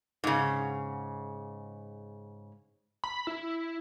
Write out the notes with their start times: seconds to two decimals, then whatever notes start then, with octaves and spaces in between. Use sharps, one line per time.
0.24 G#2 C#3
3.04 B5
3.27 E4